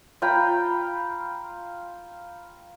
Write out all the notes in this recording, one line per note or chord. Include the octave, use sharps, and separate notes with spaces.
F4 G5 A#5 B5